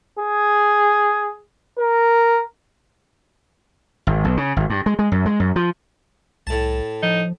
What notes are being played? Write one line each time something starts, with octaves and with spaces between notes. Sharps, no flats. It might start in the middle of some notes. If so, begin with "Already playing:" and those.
G#4
A#4
G#1
B1
C#3
G#1
G2
G#3
G#3
F#2
G#3
F#2
F3
C2 A2 A5
F3 D#4